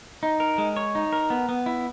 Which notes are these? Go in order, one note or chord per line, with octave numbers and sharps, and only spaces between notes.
D#4
A#4
G#3
C#5
D#4
A#4
B3
B3
E4